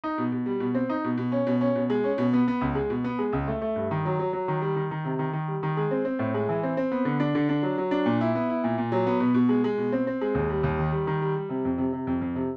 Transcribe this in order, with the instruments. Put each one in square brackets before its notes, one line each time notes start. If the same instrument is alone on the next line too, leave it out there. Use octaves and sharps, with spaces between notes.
[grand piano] D#4
B2
B2
G3
B2
C4
D#4
B2
B2
C#4
B2
C#4
B2
G#3
C#4
B2
B3
B3
C#2
G#3
B2
B3
G#3
C#2
A3
A3
G2
D#3
F#3
F#3
F#3
D#3
G3
D#3
D#3
C3
D#3
D#3
G3
D#3
G#3
C4
C4
A2
G#3
E3
C4
C4
B3
D3
D4
D3
D4
F#3
F#3
D4
A#2
E4
B3
E4
A#2
A#2
F#3
B3
B2
B2
G#3
G#3
B2
C4
C4
G#3
D#2
G3
D#2
D#3
G3
D#3
G3
G3
C3
F2
C3
C3
F2
F2
C3